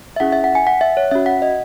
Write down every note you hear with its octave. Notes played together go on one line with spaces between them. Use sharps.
E5
C#4 E4 G#4 F#5
E5
F#5
G#5
F#5
E5
C#5
C#4 F#4 E5
F#5
D#5